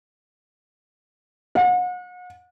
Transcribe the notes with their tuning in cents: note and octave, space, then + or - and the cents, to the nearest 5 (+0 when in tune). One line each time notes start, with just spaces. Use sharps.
F#5 -40